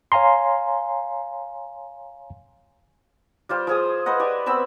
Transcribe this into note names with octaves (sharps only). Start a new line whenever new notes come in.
C#5 F5 G#5 A#5 C6
G3 F4 C5
F3 G#4 D#6
B4 C5 D#5 F#5
G4 D5 G#5
B3 C4 B5 E6